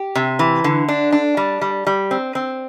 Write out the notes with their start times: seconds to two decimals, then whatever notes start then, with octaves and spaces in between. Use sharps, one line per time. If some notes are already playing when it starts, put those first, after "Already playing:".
Already playing: G4
0.15 C3
0.39 E3
0.64 D3
0.89 D4
1.12 D4
1.37 G3
1.61 G3
1.87 G3
2.11 C4
2.35 C4